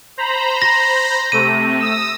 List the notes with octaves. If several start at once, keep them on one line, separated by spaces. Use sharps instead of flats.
C5 A#5 B5
A#6
C3 A3 D#7
D#6 E6